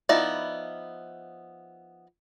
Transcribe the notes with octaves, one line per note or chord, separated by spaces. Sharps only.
F3 B3 D#4 E4 D5